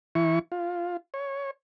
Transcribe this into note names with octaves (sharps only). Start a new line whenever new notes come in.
E3 E4 C#6
F4
C#5